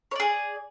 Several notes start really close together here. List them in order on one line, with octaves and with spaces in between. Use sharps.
C#5 D5 G#4